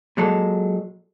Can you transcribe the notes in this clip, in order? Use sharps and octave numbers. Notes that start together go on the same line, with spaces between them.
A#2 F#3 G#3 A4